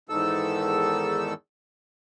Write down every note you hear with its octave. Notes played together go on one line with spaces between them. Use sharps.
E2 G#2 D#3 A4 E6